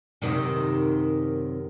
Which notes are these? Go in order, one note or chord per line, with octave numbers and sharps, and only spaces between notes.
F#2 C3 D#3